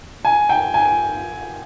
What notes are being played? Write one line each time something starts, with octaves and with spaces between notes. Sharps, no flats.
G#5
G5
G#5